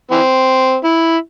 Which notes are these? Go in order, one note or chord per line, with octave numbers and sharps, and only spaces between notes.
E3 C4
E4